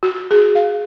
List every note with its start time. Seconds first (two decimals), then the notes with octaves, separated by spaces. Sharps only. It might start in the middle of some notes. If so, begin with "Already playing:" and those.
0.03 F#4
0.31 G#4
0.55 F5